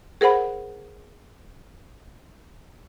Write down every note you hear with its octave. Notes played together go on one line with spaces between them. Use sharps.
G#4 A#4 C5 F#5 B5